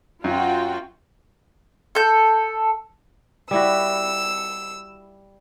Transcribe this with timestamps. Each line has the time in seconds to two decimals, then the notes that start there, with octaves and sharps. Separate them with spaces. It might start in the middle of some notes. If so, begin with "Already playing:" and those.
0.24 F#2 F4 F#4 G5
1.95 A4 G6
3.51 G3 E4 F#4 E6